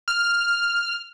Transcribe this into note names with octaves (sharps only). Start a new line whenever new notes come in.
F6